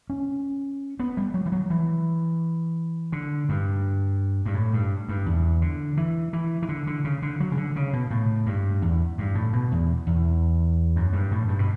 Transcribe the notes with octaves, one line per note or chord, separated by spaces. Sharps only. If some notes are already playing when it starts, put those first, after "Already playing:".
C#4
B3
G3
F#3
E3
F#3
E3
D3
G2
G2
A2
G2
G2
E2
D3
E3
E3
E3
D3
D3
C#3
D3
F#3
C#3
D3
C#3
B2
A2
G2
E2
G2
A2
B2
E2
E2
F#2
G2
A2
G2
B2